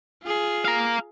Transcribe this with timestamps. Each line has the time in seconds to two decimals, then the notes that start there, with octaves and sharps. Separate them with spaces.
0.23 F4 G#4
0.65 F5 A#5